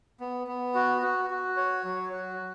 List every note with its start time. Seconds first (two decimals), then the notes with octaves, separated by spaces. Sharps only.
0.20 B3
0.47 B3
0.75 F#4
1.02 F#4
1.30 F#4
1.57 C#5
1.84 F#3
2.13 F#4